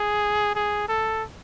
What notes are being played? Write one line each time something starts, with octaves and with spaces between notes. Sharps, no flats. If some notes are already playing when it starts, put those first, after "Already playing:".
Already playing: G#4
G#4
A4